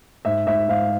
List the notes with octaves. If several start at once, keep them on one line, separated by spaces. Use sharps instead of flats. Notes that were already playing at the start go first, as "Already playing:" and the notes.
G#2 E5
G#2 E5
G#2 F5